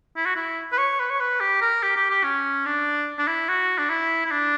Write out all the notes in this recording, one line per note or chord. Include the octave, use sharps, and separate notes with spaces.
E4
F#4
E4
B4
C#5
B4
C#5
B4
G4
A#4
G4
G4
G4
C#4
D4
D4
E4
F#4
D4
E4
E4
D4